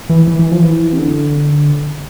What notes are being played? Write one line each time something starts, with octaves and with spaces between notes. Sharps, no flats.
E3
E3
E3
F3
E3
C3
D3